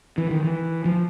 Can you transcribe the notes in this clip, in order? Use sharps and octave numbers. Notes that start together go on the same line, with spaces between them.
E3
D#3
E3
F3